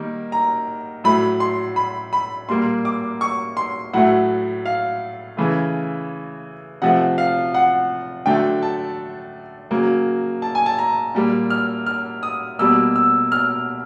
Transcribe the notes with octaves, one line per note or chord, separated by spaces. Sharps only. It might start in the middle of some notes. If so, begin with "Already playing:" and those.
Already playing: D#3 G3 A#3
A#5
A2 F#3 A3 B5
C6
B5
B5
A#2 G3 A#3 C6
D6
C#6
C6
A2 F#3 A3 F#5
F5
C#3 E3 A3
C3 F3 A3 F#5
F5
F#5
D3 F#3 A3 G5
A5
C#3 F#3 A#3
A5
G#5
A5
A#5
A#2 G3 A#3
F6
F6
D#6
B2 G3 A#3 E6
E6
F6